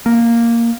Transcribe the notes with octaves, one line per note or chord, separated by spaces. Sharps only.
A#3